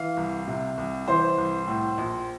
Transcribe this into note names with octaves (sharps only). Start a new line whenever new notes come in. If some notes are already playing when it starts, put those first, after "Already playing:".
Already playing: E3 F5
C2
C3
C2
E3 C5
C2
A2
A#1